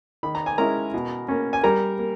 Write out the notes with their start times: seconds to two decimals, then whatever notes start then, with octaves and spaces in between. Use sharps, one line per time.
0.23 D#3 B5
0.35 A#5
0.46 G#5
0.58 G#3 C#4 E4 A#4 A#5
0.94 B2
1.28 A#3 C#4
1.53 G#5
1.64 G3 A#4 A#5
1.99 A#3